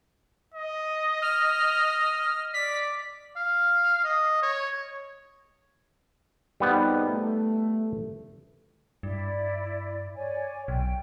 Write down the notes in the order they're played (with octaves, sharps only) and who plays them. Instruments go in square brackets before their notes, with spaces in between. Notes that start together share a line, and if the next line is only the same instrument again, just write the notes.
[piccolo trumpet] D#5
[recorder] F6
[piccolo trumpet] D5 [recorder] B6
[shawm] F5
D#5
C#5
[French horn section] F2 G#2 D#4 [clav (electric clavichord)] G3 B3
[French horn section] A3
[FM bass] G2 [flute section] E4 D5
[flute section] C#5 D5 G#5
[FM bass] B1 [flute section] G5